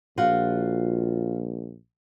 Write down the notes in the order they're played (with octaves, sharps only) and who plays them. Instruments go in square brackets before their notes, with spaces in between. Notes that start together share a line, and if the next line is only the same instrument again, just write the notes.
[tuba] A#1 [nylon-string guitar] F4 F#4 F#5